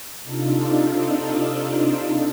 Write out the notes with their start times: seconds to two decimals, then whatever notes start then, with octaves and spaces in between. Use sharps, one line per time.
0.24 C3 D4 D#4 F4 A4